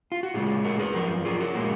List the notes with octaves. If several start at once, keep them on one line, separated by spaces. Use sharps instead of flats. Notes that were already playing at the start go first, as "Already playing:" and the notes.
F4
F#4
A#2 G#3 F4 G#4
F#4 A#4
G#4 B4
F#2 F3 A#4
F4 G#4
F#4 A#4
A#2 G#3